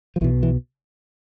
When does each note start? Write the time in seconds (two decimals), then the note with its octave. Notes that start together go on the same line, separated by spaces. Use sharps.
0.16 F3
0.21 B1 E3
0.24 B2
0.43 E3